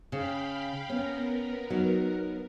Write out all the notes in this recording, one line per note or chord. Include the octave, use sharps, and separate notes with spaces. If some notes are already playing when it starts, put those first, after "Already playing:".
C#3 F5 G5 B5
B3 C#4 A#4
F#3 D#4